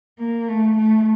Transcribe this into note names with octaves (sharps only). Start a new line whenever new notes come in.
A#3
A3
A3